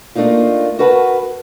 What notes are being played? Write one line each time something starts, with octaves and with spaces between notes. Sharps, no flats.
A3 A#3 D4 D#4 F4
F#4 A#4 B4 F#5 A5